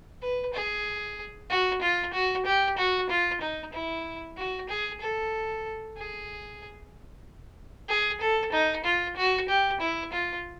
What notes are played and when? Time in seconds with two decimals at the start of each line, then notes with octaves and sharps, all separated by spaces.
0.22 B4
0.54 G#4
1.50 F#4
1.82 F4
2.13 F#4
2.46 G4
2.77 F#4
3.10 F4
3.41 D#4
3.73 E4
4.37 F#4
4.69 G#4
5.01 A4
5.97 G#4
7.88 G#4
8.21 A4
8.52 D#4
8.84 F4
9.16 F#4
9.48 G4
9.80 E4
10.12 F4